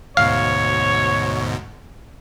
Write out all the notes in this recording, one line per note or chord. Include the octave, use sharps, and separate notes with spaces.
D2 G#2 B2 C#5 F5